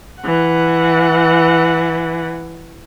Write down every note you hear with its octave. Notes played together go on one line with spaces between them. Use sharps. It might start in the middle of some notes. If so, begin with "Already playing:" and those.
E3 F#5